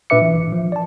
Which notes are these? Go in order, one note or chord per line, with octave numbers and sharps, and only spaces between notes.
A#2 D4 B4 E5 D6 C#7
E3
G#1
F3
D5 A5